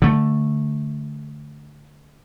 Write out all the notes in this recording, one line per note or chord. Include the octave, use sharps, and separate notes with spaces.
D3 A3